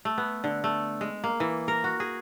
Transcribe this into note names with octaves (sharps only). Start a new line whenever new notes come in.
A3
B3
D3
A3
G#3
A#3
E3
A#4
F#4
G#4